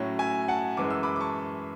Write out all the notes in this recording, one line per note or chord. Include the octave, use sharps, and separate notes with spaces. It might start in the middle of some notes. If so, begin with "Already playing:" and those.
Already playing: A2 F#3 C#4
E5 G#5
F#5 A5
F#2 E3 G#3 D6
E6
B5 D6
D6
A5 C#6